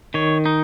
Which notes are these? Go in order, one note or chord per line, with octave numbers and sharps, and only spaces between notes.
D#3 C#5
D#4